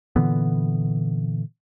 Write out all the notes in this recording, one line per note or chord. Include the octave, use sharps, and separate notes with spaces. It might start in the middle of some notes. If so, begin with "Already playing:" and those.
A#2 D3 E3 B3